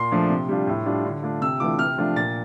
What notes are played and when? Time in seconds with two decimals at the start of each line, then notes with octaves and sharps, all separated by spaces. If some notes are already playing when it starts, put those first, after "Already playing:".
Already playing: A#2 C6
0.11 F3 A3 D4
0.30 C3
0.49 G3 D4 F4
0.67 A2
0.86 G3 D4 F4
1.04 D3
1.23 A3 D4 F4
1.41 C3 E6
1.60 E3 A3 D4 F4 D6
1.79 C3 F6
1.98 F3 A3 D4 F4
2.16 A#2 A6